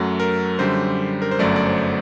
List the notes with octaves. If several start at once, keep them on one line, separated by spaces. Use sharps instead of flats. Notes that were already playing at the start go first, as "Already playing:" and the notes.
Already playing: F#2 F#3 A3
A#4
F#2 D3 G3 C5
A#4
C5
G1 F#2 F#3 A3 D5
D5
C5